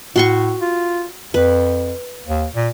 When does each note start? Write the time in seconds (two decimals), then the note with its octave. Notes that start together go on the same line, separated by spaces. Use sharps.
0.16 A2 F#4 C6 C#6
0.61 F4
1.34 F2 B4
2.27 D#2
2.55 A#2